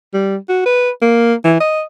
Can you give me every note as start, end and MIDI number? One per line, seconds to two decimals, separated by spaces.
0.13 0.36 55
0.49 0.63 66
0.66 0.90 71
1.02 1.34 58
1.44 1.60 52
1.60 1.82 75